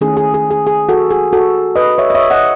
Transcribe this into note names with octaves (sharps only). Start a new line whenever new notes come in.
D#3 A3 C#4 E4 G#4
G#4
G#4
G#4
G#4
F#4 A4
G#4
F#4 A4
B4 D#5
C#5 E5
D#5
C#5 E5
D#5 F#5